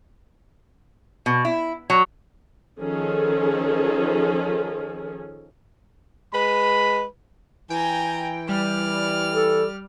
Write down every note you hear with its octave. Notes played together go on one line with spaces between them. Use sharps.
B2
E4
F#3
D#3 F3 C#4 G#4 A4
G#3 B4 B5
E3 G5 G#5 A#5
G3 D5 F6
A4